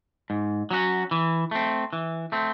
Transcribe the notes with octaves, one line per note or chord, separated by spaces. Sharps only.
G#2
F#3 C#4 F#4
E3
A3 C4
E3
A3 C4